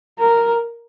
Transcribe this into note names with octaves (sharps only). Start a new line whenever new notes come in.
A#4